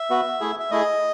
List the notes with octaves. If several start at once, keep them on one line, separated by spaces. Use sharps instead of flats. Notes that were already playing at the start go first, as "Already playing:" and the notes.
Already playing: E5
B3 F#4
A3 E4 G#4
E5
A3 E4 G#4 D#5